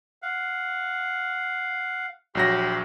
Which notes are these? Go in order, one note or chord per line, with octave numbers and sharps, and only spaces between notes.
F5 F#5
A#1 F#3 G4 B5 C6 A#6